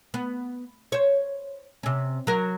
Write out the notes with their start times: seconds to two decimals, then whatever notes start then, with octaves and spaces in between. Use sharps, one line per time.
0.14 B3
0.92 C5 C#5
1.83 C3 C#4
2.27 F#3 A#4